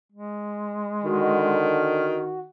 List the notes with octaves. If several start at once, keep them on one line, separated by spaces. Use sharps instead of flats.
G#3
D3 D#3 F#4